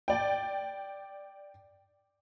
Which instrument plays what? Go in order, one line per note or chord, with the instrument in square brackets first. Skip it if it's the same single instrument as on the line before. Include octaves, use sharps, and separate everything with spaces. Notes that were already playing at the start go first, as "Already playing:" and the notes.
[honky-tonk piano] D5 G5